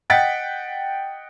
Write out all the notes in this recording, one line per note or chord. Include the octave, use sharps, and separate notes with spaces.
D#5 F#5 G5 A6 B6